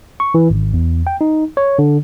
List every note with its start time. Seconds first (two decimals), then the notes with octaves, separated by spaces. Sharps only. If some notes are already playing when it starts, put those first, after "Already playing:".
0.20 C#6
0.34 E3
0.50 G#1
0.74 E2
1.07 G5
1.21 D#4
1.57 C#5
1.79 D3